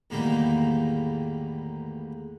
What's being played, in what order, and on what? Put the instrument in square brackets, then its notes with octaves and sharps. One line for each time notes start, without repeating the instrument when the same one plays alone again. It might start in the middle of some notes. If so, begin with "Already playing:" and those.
[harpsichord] E2 A2 D3 D#3 G3 A#3